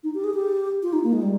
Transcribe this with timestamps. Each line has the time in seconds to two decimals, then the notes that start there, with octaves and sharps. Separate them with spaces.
0.04 D#4
0.14 G4
0.24 G#4
0.34 G4
0.83 F4
0.93 D#4
1.04 A#3
1.13 G#3
1.22 G3